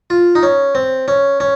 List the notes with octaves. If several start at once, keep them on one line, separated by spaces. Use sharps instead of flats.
F4
D#4
C#4
C4
C#4
C#4